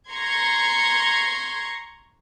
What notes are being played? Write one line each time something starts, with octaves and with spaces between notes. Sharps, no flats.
A#5 C6 C#6 G#6